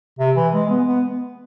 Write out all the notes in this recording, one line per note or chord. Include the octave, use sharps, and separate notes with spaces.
C3
E3
G#3
B3
B3